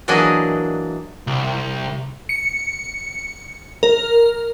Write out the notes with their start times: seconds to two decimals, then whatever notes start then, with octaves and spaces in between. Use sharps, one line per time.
0.08 E3 F#3 A#3 D4 G#4 D#5
1.27 C2
2.29 C#7
3.83 A#4